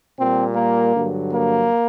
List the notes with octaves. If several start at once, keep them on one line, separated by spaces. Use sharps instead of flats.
A#2 G3 C4
A#3
G2 D3 F#3
A#3